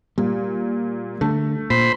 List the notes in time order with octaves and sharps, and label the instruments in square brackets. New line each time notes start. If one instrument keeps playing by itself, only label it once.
[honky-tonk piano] A#2 [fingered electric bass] G3
[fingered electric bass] D3 [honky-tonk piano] A3
[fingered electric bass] A#2 [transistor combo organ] C5 B5